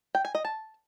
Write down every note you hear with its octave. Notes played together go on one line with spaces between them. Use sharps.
G5
G#5
D#5
A5